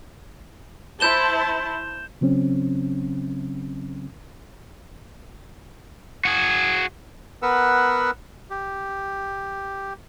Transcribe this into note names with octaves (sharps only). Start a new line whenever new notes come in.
E4 C5 A5 G6 E7 G7
C#3 F#3 C4 C#4
F#4 G#4
B3 A#4 B4 F#5 E6
G4